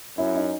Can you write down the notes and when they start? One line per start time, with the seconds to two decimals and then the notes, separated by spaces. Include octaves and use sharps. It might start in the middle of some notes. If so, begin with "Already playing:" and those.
0.18 F#2 E4
0.36 D#4